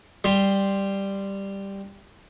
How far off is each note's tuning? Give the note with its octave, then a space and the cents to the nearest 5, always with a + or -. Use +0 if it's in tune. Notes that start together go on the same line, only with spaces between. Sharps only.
G3 +5 C6 -5